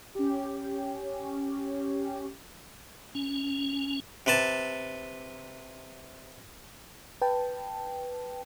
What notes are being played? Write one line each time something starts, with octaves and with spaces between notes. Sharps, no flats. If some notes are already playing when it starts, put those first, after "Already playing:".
C#4 G4
C#4
C3 B4 A5
B4 G5 A5